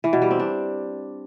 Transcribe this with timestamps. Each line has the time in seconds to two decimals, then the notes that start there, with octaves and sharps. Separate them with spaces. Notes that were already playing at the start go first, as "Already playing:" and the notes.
0.04 E3
0.13 B2
0.22 G3
0.31 C4
0.39 D4